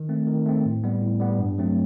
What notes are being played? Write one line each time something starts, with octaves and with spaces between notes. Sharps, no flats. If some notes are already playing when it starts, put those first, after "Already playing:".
Already playing: D#3
A3 C4
D#3
A3 C4
A2
G3 B3
A2
G3 B3
G2
F#3 A3 C4